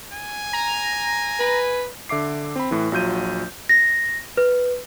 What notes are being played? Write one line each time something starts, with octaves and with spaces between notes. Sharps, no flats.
G#5
A#5
B4
D3 E5 D6 C7
C4 B5
A2 E3
A#1 F#3 F4 G6 D#7
A#6
B4